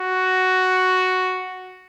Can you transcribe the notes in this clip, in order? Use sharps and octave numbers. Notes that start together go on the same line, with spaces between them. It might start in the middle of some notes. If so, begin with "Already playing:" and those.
Already playing: F#4